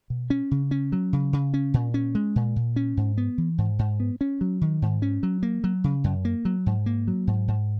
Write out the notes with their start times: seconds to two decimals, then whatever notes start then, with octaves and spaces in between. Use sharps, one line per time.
0.10 B2
0.30 C#4
0.51 C#3
0.71 C#4
0.92 F#3
1.13 C#3
1.33 C#3
1.54 C#4
1.74 A#2
1.94 C#4
2.15 G#3
2.36 A#2
2.56 A#2
2.76 C#4
2.97 G#2
3.18 B3
3.38 E3
3.58 G#2
3.79 G#2
4.00 B3
4.21 C#4
4.41 F#3
4.61 D#3
4.82 G#2
5.02 C#4
5.23 F#3
5.43 A#3
5.64 F#3
5.84 C#3
6.04 F#2
6.25 A#3
6.45 F#3
6.66 G#2
6.86 A#3
7.08 F#3
7.27 G#2
7.48 G#2